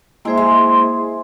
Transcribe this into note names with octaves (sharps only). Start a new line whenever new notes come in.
G#3 A#3 E4 G#4 C5 E5
G#3